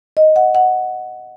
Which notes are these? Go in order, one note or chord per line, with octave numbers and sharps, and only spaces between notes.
D#5
F#5
F#5